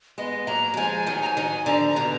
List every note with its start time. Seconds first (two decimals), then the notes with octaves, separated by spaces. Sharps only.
0.18 G#3 B3 D#5
0.47 F#3 A#3 A#5
0.74 F#3
0.77 F3 G#3 G#5
1.06 D#3 F#3
1.22 A#5
1.26 G#5
1.37 D#3 F#3
1.66 D3 F3 A#5
1.89 A#5
1.96 B2 D#3